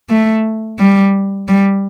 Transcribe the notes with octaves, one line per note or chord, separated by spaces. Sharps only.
A3
G3
G3